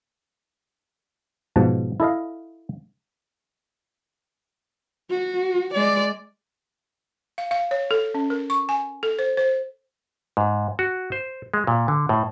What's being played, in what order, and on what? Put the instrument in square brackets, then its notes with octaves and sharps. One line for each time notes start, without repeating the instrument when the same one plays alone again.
[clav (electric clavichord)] G#2 B2 F3 A5
E4 A4 D#5 F5
[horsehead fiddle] F#4
G#3 D5
[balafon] F5
F5
C#5
A4
C#4
A#4
C#6
G#5
A4
C5
C5
[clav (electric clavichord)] G#2
F#4
C5
G#3
A#2
D3
A2